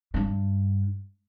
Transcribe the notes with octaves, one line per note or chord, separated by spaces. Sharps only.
G2 D4